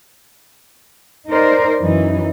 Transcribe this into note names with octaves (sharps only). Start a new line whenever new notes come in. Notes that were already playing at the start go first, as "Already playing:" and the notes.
D#4 A#4 C5 D5
F#2 E3 D#4